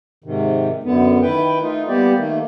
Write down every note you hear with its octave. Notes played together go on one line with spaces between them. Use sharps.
G#2 C3 D#3
F#2 D3 B3
D#3 E4 B4 G5
A3 D#4 F4
G3 A#3 B3 G4 D5
D#3 A3 A#3